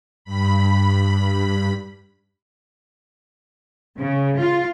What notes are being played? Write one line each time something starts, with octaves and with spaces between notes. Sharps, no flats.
G2 B5
C#3
F4